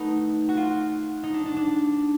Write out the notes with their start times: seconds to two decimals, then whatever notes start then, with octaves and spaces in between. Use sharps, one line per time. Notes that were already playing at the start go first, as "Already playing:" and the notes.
Already playing: A3 B3 D#4
0.49 F#4
0.57 F4
1.23 D#4
1.34 D4
1.46 D4
1.56 D4